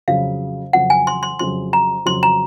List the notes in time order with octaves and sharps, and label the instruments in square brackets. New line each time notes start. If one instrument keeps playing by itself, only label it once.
[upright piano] F2 C#3 F#3 [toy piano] F5
[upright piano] F2 C#3 F#3 [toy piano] F#5
[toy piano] G#5
C6
C6
[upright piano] F2 C#3 F#3 [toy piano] C6
[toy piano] A#5
[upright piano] F2 C#3 F#3 [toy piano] C6
[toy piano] A#5